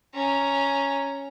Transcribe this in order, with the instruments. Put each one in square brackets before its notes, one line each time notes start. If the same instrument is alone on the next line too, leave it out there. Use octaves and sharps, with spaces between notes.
[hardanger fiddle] C#4 A#5